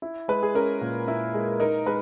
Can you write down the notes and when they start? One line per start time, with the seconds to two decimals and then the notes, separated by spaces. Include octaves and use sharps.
0.02 E4
0.28 G#3 B4
0.43 G#4
0.55 C#4 A#4
0.81 A#2
1.08 E4
1.34 G#3
1.60 D#4 A#4
1.86 G#3 B4